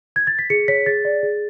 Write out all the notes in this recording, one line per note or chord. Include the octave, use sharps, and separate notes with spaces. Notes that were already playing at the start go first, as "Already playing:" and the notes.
G#6
A6
B6
G#4 C#7
C#5 B6
G#4 A6
D5
G#4